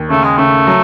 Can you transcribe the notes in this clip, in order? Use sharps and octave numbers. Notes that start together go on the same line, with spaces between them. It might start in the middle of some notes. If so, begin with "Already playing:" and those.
Already playing: D#2
C#3 A3
G#3
C#3 A3
F#3